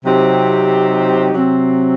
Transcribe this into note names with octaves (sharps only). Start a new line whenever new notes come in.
C3 F#3 C4 D#4 G4
C3 F#3 C4